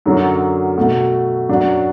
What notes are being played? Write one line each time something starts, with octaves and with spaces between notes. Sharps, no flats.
F#2 D3 F#3
B2 A3 F#4
F#2 F#3 D4 F#4